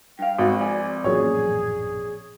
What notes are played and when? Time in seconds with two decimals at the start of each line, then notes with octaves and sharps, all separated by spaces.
0.19 G2 F5 G5
0.38 G#1 F#4
0.59 F2 D5 G#5
1.04 A1 F#2 A#2 G#4 C#5